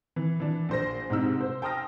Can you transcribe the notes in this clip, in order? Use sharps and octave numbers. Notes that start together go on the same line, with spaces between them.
E3
E3 D4
A#1 C5 A#6
G#2 C3 D#4 E6
C5
G5 A5 C6 D#6 F6 A#6